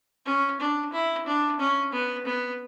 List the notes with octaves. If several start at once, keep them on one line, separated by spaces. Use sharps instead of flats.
C#4
D4
E4
D4
C#4
B3
B3